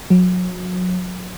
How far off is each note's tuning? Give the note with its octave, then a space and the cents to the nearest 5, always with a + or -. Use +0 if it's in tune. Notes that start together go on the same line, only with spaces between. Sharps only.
F#3 -30